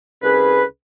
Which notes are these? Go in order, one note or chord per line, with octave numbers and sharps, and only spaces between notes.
C2 C#4 G#4 B4